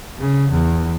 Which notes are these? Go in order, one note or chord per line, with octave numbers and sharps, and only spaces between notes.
C#3
E2